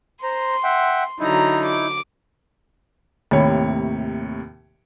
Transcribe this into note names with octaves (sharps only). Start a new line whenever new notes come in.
C5 A#5 C6
E5 F#5 G5
D3 F#3 D#4 E4 A#5
D6
D#2 A2 C3 C#5 B5